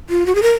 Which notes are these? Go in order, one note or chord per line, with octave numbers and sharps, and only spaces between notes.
F4
F#4
G#4
A#4